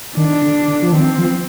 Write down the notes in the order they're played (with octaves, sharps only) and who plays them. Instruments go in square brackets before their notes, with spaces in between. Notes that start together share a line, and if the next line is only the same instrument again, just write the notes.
[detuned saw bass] D#3 [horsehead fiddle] D4
[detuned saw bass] D3
D3
F3
[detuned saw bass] D#3 [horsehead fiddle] C4
[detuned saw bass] F3